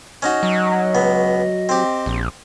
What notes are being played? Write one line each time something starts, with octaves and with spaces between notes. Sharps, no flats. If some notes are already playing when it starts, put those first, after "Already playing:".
C#4 D#4 F#4 D#5
F#3
C#2 B3
C4 G4
A#1